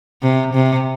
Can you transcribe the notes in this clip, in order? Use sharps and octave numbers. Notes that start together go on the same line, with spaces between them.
C3
C3